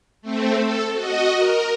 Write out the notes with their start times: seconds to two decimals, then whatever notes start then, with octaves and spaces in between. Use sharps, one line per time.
0.22 A3 C4
0.56 A4
0.93 F#4 D#5
1.37 A#4